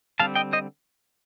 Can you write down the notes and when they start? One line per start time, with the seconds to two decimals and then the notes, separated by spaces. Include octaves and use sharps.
0.20 D3 G3 C4 F5 A5
0.35 D#5 G5
0.53 C5 D#5